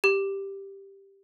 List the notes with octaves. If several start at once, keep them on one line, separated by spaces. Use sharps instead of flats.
G4